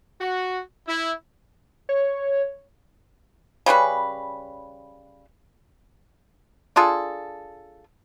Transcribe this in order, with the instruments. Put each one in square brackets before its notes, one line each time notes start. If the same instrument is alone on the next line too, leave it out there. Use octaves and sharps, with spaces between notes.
[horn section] F#4
E4
[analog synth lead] C#5
[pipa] C#3 G3 C#4 B4
D4 F4 G#4 A4